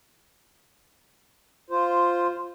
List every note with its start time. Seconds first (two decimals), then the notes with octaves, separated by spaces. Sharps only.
1.70 F4 C5